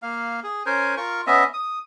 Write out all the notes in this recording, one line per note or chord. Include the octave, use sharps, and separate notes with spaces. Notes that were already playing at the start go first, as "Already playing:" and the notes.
A#3 F5
G#4
C#4 A#4 C5 G#5
F4 A#4 C#6
B3 C#4 D#5 E5
D#6